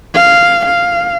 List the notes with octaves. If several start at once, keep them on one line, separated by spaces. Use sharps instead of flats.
F5
F5